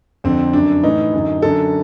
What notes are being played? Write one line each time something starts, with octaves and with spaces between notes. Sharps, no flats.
F2 D3 C4
F#2 D3 D4
A2 E3 D#4
F#2 D3
F#2 D3 A4